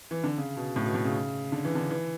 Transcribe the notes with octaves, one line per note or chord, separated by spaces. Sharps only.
E3
D3
C#3
B2
A2
B2
A2
C#3
D3
E3
D3
E3